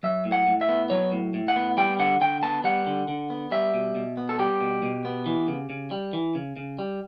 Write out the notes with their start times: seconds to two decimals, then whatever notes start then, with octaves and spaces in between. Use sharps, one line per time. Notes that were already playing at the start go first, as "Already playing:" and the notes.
0.03 F#3 E5
0.25 A2
0.32 F#5
0.47 A2
0.61 E5
0.69 B3
0.90 F#3 C#5
1.12 A2
1.34 A2
1.48 F#5
1.56 B3
1.77 G3 G5
1.99 D3 F#5
2.21 D3 G5
2.43 B3 A5
2.64 G3 F#5
2.87 D3
3.08 D3
3.30 B3
3.51 G3 E5
3.74 B2
3.95 B2
4.17 B3
4.29 A4
4.39 G3 G4
4.61 B2
4.83 B2
5.05 B3
5.26 E3
5.48 C#3
5.70 C#3
5.91 G3
6.13 E3
6.35 C#3
6.57 C#3
6.79 G3